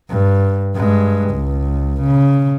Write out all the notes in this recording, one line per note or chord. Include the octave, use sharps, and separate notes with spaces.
G2
G2 G#3
C#2
C#3